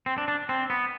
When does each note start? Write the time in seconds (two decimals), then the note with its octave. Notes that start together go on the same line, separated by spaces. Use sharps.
0.06 C4
0.18 D4
0.28 D4
0.49 C4
0.70 B3